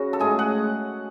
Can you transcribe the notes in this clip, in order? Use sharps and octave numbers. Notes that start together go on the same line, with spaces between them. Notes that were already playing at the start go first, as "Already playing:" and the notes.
Already playing: C#3 F#4
A4
A2 G#3 G#4
F#5